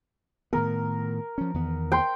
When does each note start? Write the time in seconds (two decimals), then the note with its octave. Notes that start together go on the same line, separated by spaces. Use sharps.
0.53 A2 D#3 B3 A#4
1.38 F3 C#4
1.54 E2 D#3 B3
1.92 G5 C6